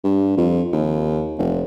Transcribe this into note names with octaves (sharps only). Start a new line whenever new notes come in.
G2
F2
D#2
F1